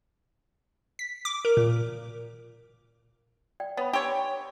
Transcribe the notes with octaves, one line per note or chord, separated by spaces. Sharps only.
B6
D6
A#4
A#2
D5 G5
B3 C#5 B5
G4 C#5 G#5 C6 E6